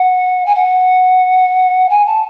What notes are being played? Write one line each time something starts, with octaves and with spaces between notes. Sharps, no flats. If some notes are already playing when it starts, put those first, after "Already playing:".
Already playing: F#5
G#5
F#5
G#5
A5